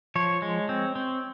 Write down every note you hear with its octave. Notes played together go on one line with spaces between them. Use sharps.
F3 C#5
G#3
C4
C4